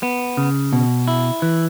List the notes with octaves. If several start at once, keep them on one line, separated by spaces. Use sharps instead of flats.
B3
C#3
B2
E4
E3